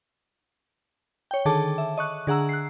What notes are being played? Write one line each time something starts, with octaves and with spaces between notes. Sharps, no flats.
C#5 G5
D3 D#3 G#4 A4 A5 D6
E5
D#5 C#6 F#6
D3 G#4 F#5 A#5 E6
F#6 C7